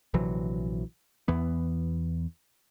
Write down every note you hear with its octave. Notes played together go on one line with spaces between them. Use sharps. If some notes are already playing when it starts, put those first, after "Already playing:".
A#1 C3 E3 F#3
E2 E3 B3